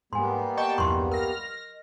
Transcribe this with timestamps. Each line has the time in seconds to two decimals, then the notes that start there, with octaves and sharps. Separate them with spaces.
0.13 G#2 G3 A#3 B3 G#5 C6
0.57 D#5 G5 A5 C#6
0.78 B1 E2 G2 C6 C#6
1.11 A#4 F6 A#6